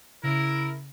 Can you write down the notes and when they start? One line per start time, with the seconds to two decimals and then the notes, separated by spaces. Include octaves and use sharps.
0.23 C#3 E4 A#4